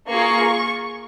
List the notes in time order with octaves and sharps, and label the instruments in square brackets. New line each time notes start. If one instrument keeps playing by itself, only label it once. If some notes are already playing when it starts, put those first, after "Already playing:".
[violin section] A#3 F4 G#4 C#6